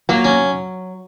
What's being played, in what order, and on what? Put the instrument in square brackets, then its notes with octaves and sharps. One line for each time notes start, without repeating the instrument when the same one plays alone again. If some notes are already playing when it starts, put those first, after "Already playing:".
[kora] F#3 [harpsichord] A#3
[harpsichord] C#4